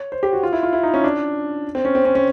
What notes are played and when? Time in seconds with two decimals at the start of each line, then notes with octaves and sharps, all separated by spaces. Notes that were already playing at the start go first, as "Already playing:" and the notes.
Already playing: C#5
0.12 C5
0.23 G4
0.33 F#4
0.43 F4
0.53 E4
0.63 F4
0.73 E4
0.83 D#4
0.94 C#4
1.04 D4
1.75 C4
1.85 C#4
1.95 C4
2.05 C#4
2.15 C#4